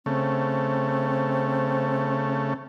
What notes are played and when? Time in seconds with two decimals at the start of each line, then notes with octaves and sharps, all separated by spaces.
0.06 C#3 A3 C4